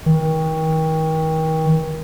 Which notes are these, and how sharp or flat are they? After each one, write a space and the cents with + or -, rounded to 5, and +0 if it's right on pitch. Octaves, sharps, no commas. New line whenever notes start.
D#3 +35